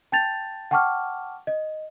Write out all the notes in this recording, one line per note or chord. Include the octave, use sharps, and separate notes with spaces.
G5 A5 G6 A6 F7
F#5 G5 A5 C#6 D6 F6
D#5